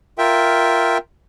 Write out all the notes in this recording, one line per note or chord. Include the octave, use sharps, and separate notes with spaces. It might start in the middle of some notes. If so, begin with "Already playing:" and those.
F4 A#4 E5 G5